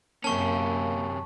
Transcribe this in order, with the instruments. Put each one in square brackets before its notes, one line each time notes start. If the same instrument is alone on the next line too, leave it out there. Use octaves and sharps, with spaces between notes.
[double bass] F#2 [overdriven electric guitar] C3 C#4 [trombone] A#3 [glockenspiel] A5 C#6